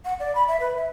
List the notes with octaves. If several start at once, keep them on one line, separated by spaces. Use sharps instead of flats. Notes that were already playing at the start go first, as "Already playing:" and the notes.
F#5
D5
B5
E5
B4
E5